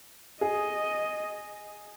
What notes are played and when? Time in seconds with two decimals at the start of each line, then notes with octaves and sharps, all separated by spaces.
0.41 G#4 D#5